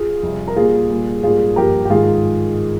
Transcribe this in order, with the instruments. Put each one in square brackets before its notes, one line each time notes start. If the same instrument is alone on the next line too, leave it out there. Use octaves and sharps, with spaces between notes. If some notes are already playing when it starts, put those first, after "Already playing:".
Already playing: [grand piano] F4 G#4
F2 C3 G3
A#4
A#2 G3 A#3 F4 G#4
A#2 G3 A#3
G#2 G3 A#3 F4 G#4
G2 F3 A#3 G4 A#4
G4
G#2 D#3 G#3 F4 G#4